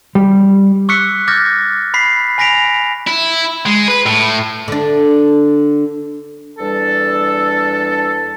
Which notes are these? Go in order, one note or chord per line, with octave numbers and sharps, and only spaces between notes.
G3
C#6 D6 E6 F#6 B6 C#7
D6 F6 G6 A6 A#6
B5 B6 C7
G#5 B5 A#6 B6 D7 F7
E4
G#3
B4
A2
D3 D4
E2 G3 D4 A4